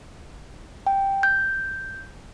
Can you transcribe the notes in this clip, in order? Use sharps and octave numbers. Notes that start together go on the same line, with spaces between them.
G5
G6